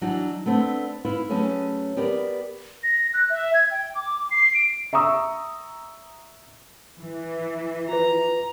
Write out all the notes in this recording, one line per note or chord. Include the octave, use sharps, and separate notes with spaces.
E3 F#3 D4 D#4 F#4
A3 B3 C4 D4
E4 F4 B4
F#3 A3 C#4 G#4 B4 C#5
B3 G4 A#4 D5
A#6
F#6
E5
G#6
G5
D6
C7
D7
E5 A#5 C#6 D#6 E6
E3
F4 B4 A#5